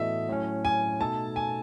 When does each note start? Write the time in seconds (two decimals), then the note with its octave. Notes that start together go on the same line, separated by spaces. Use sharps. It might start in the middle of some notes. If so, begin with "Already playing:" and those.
Already playing: A2 E3 B3 F#4 A4 D#5 E5
0.28 A2 F#3 C#4
0.65 G#5
1.00 B2 A3 D#4 A4 A5
1.36 G#5